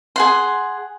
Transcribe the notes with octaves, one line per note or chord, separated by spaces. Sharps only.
G#4 F#5 C6